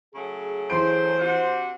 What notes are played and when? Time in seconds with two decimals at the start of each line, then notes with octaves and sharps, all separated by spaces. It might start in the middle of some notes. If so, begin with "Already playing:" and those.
0.14 C#3 F#3 A3 G#4
0.70 E3 C5 C6 D7
1.19 C3 D4 F#4